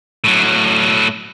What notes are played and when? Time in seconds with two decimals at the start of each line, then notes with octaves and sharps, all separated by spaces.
0.24 A2 F#3